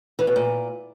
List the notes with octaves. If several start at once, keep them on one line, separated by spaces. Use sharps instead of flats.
E3
B2
A#2